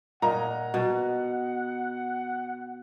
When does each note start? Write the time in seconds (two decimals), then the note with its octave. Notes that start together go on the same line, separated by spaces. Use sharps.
0.22 A#2 D#5 F#5 A#5
0.74 B2